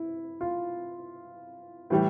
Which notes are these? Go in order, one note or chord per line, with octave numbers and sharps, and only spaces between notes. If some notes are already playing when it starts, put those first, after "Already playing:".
Already playing: E4
F4
A2 E3 G3